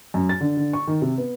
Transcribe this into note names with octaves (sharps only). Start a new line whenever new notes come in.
F#2
A6
D3
D3
C#6
D#3
C3
B3